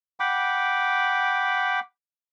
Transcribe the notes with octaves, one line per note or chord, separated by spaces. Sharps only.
F#5 G5 B5 D6